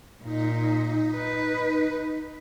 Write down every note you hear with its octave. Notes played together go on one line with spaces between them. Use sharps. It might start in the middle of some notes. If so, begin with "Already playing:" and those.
A#2 D#4
B4